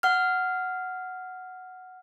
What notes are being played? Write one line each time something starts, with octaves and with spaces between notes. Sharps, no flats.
F#5 F6